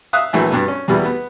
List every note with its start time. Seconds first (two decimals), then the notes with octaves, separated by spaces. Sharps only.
0.13 E5 F5 D#6 F#6
0.33 A#1 E3 F#3 A3 G#5
0.51 G2 B2 B3
0.68 C#4
0.88 E2 B2 G3 B3 E4
1.05 B3